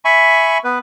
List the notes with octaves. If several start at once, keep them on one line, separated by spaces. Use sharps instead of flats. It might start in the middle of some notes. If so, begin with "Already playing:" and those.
E5 G#5 B5 C#6
B3 B4